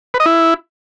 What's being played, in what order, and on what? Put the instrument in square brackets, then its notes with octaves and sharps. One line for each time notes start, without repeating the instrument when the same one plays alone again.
[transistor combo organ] B4
D#5
E4